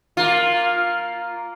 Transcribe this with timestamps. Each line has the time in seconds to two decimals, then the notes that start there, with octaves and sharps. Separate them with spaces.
0.17 A#3 F4